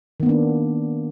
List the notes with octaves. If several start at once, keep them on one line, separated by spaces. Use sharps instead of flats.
D#3 A#3 B3 D4